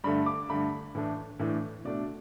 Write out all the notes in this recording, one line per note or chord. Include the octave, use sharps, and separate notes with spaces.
G2 D3 A3 B5
D6
G2 D3 A3 B5
A2 E3 A3 D4
A2 E3 A3 D4
B2 A3 D4 D5